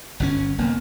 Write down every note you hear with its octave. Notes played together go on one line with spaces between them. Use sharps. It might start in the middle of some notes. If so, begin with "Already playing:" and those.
G1 C3 C#4
F1 A#3 B3